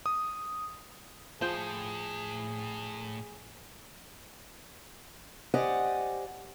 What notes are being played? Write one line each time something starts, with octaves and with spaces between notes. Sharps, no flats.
D#6
A2 F3 G#4 C5 G5
G4 C5 D5 D#5 F#5 G#5